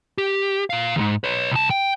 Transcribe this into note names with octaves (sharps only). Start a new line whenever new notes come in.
G4
A#2 F5
D#2 G#2
B4 C#5
C2 A5
G5